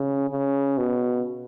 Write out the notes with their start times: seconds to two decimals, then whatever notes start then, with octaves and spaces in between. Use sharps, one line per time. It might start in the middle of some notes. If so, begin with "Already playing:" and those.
Already playing: C#3
0.30 C#3
0.78 B2